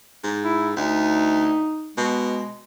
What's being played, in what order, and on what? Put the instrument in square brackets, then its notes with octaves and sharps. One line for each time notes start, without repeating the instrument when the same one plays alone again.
[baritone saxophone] G#2
[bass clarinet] E4
[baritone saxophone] D2 [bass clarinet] D#4
[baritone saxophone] B2 [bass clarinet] G#3